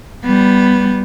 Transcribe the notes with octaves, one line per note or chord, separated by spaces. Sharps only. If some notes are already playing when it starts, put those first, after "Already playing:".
G3 B3